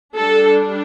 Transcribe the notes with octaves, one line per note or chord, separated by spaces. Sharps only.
G3 D4 A4